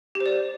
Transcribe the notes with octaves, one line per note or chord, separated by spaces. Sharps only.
G4
C5
D5